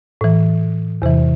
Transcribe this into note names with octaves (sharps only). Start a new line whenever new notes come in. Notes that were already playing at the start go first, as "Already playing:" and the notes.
A2 E3
E2 C3 E3